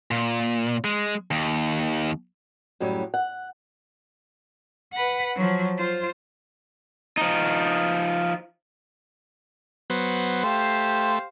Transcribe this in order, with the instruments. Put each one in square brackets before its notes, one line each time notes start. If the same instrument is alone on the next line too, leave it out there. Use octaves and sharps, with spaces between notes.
[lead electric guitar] A#2
G#3
D#2
[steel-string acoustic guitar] F#2 A2 F#3 G3
F#5
[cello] B4 F#5
F3 F#3
F4 C5
[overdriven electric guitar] F3 D#4
[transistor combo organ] F#3 B3 C5
[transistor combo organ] A3 [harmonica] G4 C5 F5